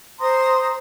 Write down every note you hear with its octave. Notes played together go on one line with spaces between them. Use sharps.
C5 A#5 C6 D#6